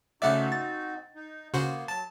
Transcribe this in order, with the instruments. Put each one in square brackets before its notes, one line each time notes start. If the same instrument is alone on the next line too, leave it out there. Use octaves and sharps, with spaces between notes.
[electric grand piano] C#3 A3 E5 [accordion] C4 D#4 F#4 [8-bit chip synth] D5 F#5
[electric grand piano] A6
[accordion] D#4
[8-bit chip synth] C#3 F#4 C5 [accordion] A#3 B3
[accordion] F#3 [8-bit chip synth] A5